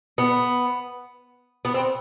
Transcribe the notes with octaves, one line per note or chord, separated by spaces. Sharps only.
B3
B3
C4